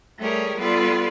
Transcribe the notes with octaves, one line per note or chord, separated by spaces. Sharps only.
G3 A3 G4 G#4 A#4 C#5
G3 B3 F4 A4 B4 D5